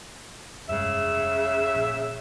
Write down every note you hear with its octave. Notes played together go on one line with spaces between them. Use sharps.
F1 G2 C#3 G#3 E5
A#1